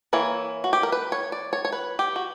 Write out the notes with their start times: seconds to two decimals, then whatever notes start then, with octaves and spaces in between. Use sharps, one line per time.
0.13 E3 A#3 E4 C#5
0.64 F#4
0.73 G4
0.83 A#4
0.92 B4
1.12 C#5
1.32 D5
1.53 C#5
1.65 C#5
1.72 B4
1.99 G4
2.16 F#4